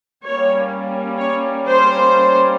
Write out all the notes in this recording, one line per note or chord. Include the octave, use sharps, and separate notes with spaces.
G3 A#3 C#4 C#5
C#5
C5